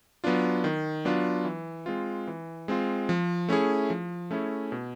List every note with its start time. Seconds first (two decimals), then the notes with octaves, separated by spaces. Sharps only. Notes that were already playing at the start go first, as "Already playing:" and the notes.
0.24 F#3 B3 D4 F4
0.64 D#3
1.05 F#3 B3 D4 F4
1.45 E3
1.86 G#3 C4 F4
2.27 E3
2.68 G#3 C4 F4
3.09 F3
3.49 A3 C#4 E4 G#4
3.90 F3
4.31 A3 C#4 E4 G#4
4.72 B2